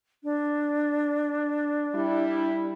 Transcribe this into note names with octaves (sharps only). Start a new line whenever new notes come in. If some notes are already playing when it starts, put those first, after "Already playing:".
D4
G3 E4